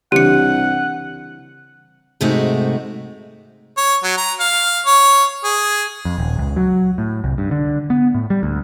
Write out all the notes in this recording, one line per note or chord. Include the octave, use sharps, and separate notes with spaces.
C2 C#3 E3 D4 G4 F#5 C#7
G#2 C3 G#3 A3 D#4 F#4
C#5
F#3
A#5
F5
C#5
G#4
F2
D#1
C#2
F#3
A2
C2
G2
D3
B3
A2
G3
D2